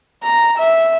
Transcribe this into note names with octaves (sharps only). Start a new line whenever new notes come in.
A#5
E5